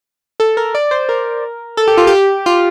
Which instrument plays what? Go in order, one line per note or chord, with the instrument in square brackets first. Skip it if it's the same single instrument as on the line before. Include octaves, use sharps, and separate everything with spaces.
[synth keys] A4
A#4
D5
C5
A#4
A4
G4
F4
G4
F4